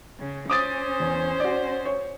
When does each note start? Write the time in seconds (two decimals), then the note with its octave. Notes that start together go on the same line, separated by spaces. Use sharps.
0.19 C#3
0.50 C#4 C5 D6 D#6 A6
1.00 E2
1.40 F#4 D5
1.86 C#5